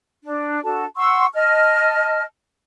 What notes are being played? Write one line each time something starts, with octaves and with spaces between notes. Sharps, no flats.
D4
D4 F#4 A4 A5
F#5 C6 C#6 E6
D#5 A5 F6